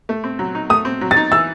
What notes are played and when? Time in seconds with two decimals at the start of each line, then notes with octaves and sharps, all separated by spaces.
0.09 A3
0.24 C4
0.39 F#3
0.55 D#4
0.70 A3 D#6
0.85 C4
1.01 F#3
1.11 A6
1.16 D#4
1.32 E3 E6